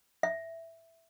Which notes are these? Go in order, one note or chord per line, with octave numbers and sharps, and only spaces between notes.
E5